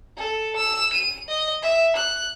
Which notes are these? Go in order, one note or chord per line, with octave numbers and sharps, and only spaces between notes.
A4
E6
D#7
D#5
E5
F#6